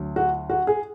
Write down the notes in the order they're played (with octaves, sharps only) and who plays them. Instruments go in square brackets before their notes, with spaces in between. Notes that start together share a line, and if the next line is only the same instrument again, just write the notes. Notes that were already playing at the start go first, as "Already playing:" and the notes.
Already playing: [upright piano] D2 F#3
F#4
F#4
G#4